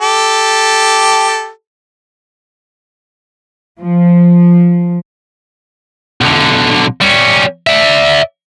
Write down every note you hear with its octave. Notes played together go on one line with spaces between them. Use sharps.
G4 A4
F3
B1 D3
G3 C#4
D5 E5